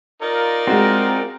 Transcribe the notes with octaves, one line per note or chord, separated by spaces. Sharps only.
D#4 F4 A#4 D5
G#3 C4 F#4